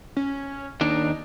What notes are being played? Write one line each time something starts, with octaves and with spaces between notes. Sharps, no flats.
C#4
D#2 D4 D#4